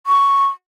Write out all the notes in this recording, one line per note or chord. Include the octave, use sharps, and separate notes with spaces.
C#6